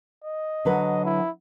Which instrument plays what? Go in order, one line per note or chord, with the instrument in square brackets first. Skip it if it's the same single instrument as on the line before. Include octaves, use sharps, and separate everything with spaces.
[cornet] D#5
[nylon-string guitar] D3 F#3 B4
[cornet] E4